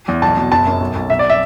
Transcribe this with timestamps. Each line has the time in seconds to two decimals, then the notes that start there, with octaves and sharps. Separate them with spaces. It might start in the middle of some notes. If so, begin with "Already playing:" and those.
0.08 E2
0.22 B1 A5
0.37 B2
0.52 F#1 A5
0.67 F#2
0.80 B1
0.95 B1
1.10 B1 E5
1.19 D5
1.30 E5